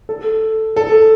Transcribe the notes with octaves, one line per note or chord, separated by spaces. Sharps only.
A4
A4